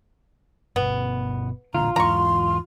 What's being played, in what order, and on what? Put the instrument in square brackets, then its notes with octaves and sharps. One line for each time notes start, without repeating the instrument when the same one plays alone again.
[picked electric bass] G1 B2 [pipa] B3
[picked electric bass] A1 A#2 D3 [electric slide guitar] F4 [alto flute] A#5
[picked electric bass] E2 G#2 E3 [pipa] A#5 C#6 [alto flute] C6